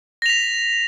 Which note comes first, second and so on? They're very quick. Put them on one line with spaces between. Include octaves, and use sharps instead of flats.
A#6 F7 B6